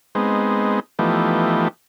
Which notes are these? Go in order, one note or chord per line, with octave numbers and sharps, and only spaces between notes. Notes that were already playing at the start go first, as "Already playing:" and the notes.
G#3 B3 C4 D#4
E3 F3 A3 B3 D#4 G4